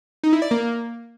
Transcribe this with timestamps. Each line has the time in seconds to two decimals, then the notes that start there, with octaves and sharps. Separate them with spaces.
0.24 D#4
0.33 E4
0.42 D5
0.51 A#3